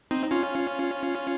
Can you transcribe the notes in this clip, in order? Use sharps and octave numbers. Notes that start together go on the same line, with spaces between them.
C4 D#4
C#4 F4